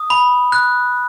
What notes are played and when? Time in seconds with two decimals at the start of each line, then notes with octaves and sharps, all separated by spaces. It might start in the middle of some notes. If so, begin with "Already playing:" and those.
Already playing: D#6
0.10 B5
0.52 F#6